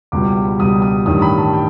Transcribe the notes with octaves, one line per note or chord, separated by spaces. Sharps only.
C#2 B2 G3 D6
C#2 B2 G3 D#6
D#6
A1 G2 D#3 G3 D#6
B5
A5
G5